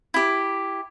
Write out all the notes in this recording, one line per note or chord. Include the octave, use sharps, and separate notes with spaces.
E4 G4